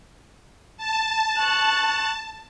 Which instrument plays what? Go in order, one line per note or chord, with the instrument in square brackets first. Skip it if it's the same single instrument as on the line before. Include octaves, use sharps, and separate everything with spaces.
[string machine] A5
[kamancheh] C#6 F#6